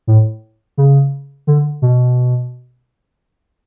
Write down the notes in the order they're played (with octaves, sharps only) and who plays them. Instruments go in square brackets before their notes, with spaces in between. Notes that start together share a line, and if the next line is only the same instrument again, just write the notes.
[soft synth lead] A2
C#3
D3
B2